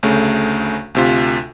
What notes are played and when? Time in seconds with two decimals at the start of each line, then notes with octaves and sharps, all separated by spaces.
0.03 D2 C#3 A3
0.95 D2 C3 F4